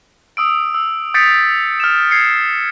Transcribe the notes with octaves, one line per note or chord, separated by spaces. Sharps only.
D#6 E6 D7
E6
D#6 G6 A6 B6 C#7 D7
F6 E7
G#6 C7 C#7